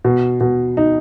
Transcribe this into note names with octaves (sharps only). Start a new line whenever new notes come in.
B2
B2
D#4